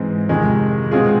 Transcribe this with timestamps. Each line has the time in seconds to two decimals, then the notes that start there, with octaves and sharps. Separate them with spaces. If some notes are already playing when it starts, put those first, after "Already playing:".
Already playing: G#2 E3 G#3 C4
0.29 F2 C3 D#3 G#3
0.91 B2 G#3 C4 F4 G#4